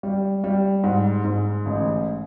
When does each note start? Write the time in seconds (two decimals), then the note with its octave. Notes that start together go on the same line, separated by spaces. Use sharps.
0.03 G3
0.44 G3
0.83 G#2
1.24 G#2
1.66 A1